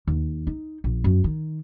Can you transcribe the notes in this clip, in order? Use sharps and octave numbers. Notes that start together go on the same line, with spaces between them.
D#2
D#4
A#1
F#2
D#3